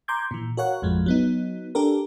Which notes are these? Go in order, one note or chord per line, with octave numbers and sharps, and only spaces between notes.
A#5 C6 D6 G6 G#6
A#2 E3
F#4 A#4 C#5 F5 F#5
A1 F2 F3 G#3
F#3 B3 D#4
D4 G4 A4 A#4